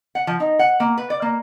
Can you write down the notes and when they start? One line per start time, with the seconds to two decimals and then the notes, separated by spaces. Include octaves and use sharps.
0.15 F#5
0.27 F3
0.40 D#4
0.59 F#5
0.80 A#3
0.98 B4
1.10 D5
1.22 A#3